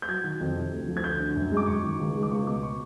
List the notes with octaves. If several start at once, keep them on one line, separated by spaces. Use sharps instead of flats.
G6
F#3 G#6
D#3
F2
C3
D2
F3
G#6
D2 G6
D3
F#2
G#3
D6
F#2 C#6
D#3
C#2
G#3
D6
C#2 C#6
B2 D6
C#6